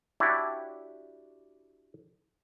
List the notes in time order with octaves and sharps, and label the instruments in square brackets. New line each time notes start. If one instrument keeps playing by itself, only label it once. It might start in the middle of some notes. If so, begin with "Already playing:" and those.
[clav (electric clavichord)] D4 E4 F#4 G4 C#5 D5